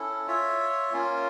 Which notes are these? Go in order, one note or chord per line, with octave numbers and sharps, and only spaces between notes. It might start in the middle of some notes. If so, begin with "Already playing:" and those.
Already playing: C#4 E4 A4
F4 C#5 E5
A#3 C#4 F4